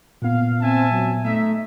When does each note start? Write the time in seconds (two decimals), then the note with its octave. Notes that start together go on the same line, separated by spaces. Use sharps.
0.22 A#2 B3 F5
0.60 C4 E5 G#5 A5
0.91 F#3
1.23 A3 D#4 E5